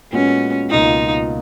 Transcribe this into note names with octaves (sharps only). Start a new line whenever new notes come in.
A#2 G#3 B3 C#4 F#4
C#2 B2 A#3 D#4 F4